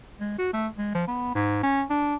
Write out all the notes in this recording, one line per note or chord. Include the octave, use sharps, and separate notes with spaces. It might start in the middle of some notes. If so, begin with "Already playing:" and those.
G#3
F#4
A3
G#3
F3
B3
G#2
C#4
D4